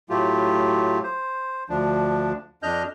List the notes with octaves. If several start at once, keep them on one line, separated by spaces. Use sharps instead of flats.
A2 F#3 A3 F4 G4
C5
D2 F3 D4
F2 D4 D#5 F6 G6